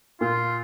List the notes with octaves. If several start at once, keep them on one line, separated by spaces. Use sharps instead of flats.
A#2 F4